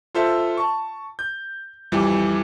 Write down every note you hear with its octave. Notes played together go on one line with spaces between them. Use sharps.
F4 A4 C5 E5
A5 C#6
G6
F2 E3 G3